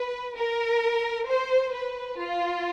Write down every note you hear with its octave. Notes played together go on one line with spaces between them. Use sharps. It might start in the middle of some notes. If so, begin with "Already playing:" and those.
Already playing: B4
A#4
C5
B4
F4